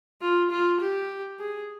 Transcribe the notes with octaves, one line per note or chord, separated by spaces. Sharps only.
F4
F4
G4
G#4